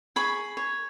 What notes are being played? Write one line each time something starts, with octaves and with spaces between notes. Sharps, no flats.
G#4 B5 C#6
C#5